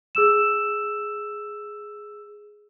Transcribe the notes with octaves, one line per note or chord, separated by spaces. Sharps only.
G#4 E6 E7